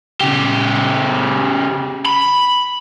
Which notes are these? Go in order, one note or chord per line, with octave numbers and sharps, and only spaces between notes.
C#3 G4
B5